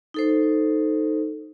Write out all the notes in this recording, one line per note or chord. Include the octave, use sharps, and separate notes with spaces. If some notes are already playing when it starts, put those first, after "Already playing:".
D#4 A4 C5